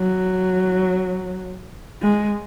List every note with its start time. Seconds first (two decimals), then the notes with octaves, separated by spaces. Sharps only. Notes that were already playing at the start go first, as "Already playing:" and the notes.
Already playing: F#3
2.02 G#3